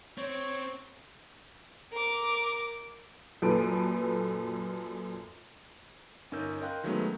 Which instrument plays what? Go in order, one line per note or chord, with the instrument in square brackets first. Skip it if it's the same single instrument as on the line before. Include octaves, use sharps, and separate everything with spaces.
[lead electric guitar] C4 [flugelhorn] C#5
[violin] A#4 D6
[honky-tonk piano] F#2 A#2 A4 B4 D7
[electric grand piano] G1 C#4 D#4 A#4 E6 G6
A#4 D#5 F5 G5 C6 F#6
D#3 F#3 G#3 A3 B3 C#4